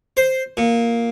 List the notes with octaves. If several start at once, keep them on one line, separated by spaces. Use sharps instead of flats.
C5
A#2